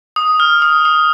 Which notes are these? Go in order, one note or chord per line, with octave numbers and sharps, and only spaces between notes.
D#6
F6
D#6
D#6